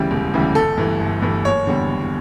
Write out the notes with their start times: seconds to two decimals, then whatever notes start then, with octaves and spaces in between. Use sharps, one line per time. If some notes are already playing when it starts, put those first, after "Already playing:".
Already playing: D2 C#3 E3 G3 G4
0.11 E1
0.34 D2 C#3 E3 G3
0.55 G1 A4
0.77 G2 E3 A3
1.00 G1
1.22 G2 E3 A3
1.45 F#1 C#5
1.67 E2 D3 G3
1.89 F#1